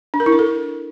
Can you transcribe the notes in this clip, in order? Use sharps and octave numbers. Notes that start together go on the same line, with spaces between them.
D4
A#4
E4
D4
A4